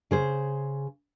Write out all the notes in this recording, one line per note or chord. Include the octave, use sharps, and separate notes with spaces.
C#3 G#4 C5